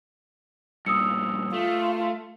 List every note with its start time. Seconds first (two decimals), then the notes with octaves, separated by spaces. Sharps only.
0.86 G2 A#2 D#6 E6 C#7
1.54 A3 F4